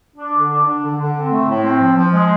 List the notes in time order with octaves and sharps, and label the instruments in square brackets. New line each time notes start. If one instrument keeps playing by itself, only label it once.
[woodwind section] D4
D3
D4
D4
D3
D3
C4
A3
A2
C4
F3
F3
G#3